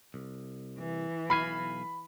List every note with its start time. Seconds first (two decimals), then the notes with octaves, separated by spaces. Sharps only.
0.14 C2
0.79 E3
1.30 B1 F5 G#5 B5